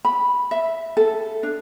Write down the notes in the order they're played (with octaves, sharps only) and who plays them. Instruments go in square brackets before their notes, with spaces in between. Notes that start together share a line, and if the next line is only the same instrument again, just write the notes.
[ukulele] B5
E5
A4
D4